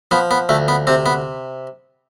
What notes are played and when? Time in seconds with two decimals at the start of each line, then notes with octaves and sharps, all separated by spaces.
0.11 F3 B3
0.31 B3
0.49 D2 A3
0.68 B3
0.87 C3 C4
1.06 B3